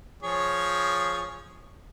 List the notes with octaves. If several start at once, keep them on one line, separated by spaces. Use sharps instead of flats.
F3 G#4 C#5